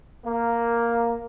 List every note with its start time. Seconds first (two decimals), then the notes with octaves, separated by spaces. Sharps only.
0.24 A#3